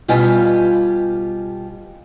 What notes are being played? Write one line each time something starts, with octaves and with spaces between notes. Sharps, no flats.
B2 G3 F4 G4 G#5